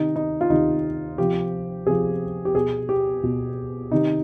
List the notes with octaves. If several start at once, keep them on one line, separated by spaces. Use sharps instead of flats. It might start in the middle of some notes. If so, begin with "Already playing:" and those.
Already playing: C3 D#3 D#4
D#4
F4
C3 D#3 D#4
C3 F3 G4
C3 F3 G#4
G4
B2 G#4
G4
B2
C3 D#3 D#4